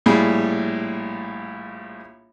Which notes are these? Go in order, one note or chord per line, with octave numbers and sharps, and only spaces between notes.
A#1 A2 G3 G#4